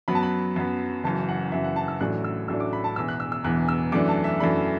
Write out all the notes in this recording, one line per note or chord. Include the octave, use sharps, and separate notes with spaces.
F#2 F#3 B3 B5
A5
B5
F#2 F#3 B3
F#1 F#2 E3 A5
F#5
F#1 F#2 E3 E5
F#5
A5
E6
A1 A2 F#3 A3 D4 F#6
E6
A1 A2 F#3 A3 D4 E6
D6
B5
A5
E1 E2 E3 E6
F#6
E6
E6
E1 E2 E3 F#6
E6
F#2 E3 A3 D4 D6
A5
E5
F#2 E3 A3 D4 B5